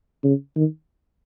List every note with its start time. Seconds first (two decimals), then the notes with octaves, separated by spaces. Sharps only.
0.23 C#3
0.56 D#3